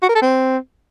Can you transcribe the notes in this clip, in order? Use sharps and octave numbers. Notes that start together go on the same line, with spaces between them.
F#4
A#4
A4
C4